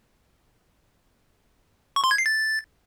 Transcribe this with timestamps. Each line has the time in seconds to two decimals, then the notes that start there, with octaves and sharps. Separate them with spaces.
1.96 C#6
2.04 C6
2.11 G#6
2.18 C7
2.26 A6